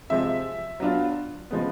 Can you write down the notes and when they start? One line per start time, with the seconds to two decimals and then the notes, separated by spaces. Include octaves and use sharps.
0.10 C3 F3 G#3 E5
0.80 F#3 B3 D4 F4
1.51 C#3 F3 G#3 B3